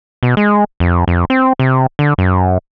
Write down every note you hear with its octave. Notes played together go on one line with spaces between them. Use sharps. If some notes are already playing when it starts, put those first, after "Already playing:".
B2
G#3
F2
F2
C4
C3
D3
F#2